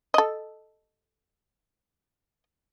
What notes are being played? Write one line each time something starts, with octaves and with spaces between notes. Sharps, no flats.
A4 D#5